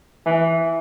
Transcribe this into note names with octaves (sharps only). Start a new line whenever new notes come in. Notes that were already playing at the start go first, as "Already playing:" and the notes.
E3